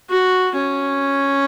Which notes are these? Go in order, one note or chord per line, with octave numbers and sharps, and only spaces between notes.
F#4
C#4